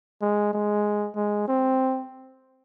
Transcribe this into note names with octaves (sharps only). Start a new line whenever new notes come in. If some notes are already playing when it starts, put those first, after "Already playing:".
G#3
G#3
G#3
C4